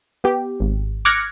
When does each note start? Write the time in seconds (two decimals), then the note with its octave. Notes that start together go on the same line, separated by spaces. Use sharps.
0.24 B3 G4
0.60 G#1
1.05 D6 F6 F#6 G#6 A#6 C#7